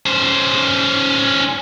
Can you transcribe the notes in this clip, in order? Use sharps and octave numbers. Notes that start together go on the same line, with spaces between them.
C#4 C5